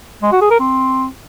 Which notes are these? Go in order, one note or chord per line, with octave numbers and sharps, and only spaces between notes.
G#3
F#4
G#4
A#4
C4